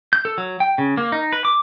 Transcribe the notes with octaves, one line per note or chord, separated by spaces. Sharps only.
G6
A4
F#3
G5
C#3
A#3
D#4
B4
D6